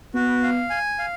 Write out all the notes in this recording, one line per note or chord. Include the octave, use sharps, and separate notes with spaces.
B3 F#4
F5
G#5
F5